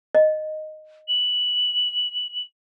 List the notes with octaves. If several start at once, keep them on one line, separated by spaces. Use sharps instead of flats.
D#5
F#7